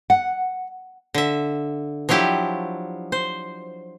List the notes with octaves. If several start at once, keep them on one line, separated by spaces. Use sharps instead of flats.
F#5
D3 E5
F3 F#3 D4 E4 G4
C5